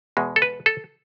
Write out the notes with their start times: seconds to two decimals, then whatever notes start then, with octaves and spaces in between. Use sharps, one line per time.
0.17 E2 B2 G#3
0.36 A4
0.42 B4
0.66 A4